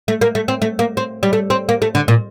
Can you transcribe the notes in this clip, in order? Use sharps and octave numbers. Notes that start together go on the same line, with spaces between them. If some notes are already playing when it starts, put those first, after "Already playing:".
A3
A#3
A3
C4
A3
A#3
C4
G3
A3
C4
A#3
A3
D3
A#2